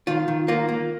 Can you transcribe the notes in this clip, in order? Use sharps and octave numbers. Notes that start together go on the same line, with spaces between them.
D#3 F4
D#3
A#3 F4
A#3